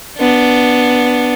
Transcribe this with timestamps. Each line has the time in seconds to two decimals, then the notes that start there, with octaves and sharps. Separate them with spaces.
0.18 B3 D4